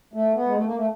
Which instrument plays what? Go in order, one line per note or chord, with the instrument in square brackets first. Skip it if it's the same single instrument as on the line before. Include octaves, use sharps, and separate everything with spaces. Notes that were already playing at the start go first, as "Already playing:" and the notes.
[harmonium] A3
B3
G#3
A3
A#3
A3